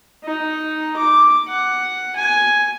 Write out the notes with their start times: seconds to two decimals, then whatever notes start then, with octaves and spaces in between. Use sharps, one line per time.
0.24 D#4
0.97 D6
1.48 F#5
2.16 G#5